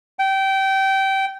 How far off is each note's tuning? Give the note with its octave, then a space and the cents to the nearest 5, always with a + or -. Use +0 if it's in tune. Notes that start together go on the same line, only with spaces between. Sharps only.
G5 -20